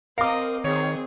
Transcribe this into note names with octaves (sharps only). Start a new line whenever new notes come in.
C4 A#4 D#5 F5 D6
D#3 C4 G#4 C#5